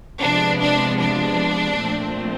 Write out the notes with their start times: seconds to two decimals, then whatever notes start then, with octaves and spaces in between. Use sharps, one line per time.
0.21 C3 F3 G#3 B3 D4
0.60 D4
0.99 D4
1.77 A#2 F3 A3 C4